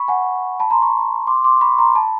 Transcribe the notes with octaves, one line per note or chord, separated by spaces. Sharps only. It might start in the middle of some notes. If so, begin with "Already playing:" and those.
Already playing: B5 C#6
F#5 G#5
A5 B5
A#5 C6
B5 C#6
C6 D6
C6 D6
B5 C#6
A#5 C6
A5 B5